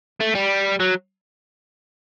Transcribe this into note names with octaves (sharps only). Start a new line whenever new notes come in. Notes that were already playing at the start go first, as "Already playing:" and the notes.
A3
G3
F#3